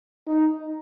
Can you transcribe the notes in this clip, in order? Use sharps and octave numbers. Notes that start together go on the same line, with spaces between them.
D#4